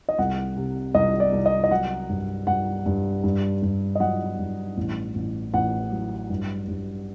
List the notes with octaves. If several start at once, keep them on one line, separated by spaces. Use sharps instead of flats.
D#5
C2 F#5
C3
C2 D#5
D5
C2
D#5
D#5
F#3 F#5
G2
G2 F#5
G2
G2
G2
D#5
F#3 F#5
G2
A1
A1
A1 F#5
F#3
G2
G2